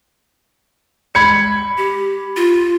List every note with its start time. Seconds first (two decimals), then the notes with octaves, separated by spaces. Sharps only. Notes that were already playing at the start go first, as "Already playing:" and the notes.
1.15 G#3 B5 G#6 C#7
1.78 G4
2.36 F4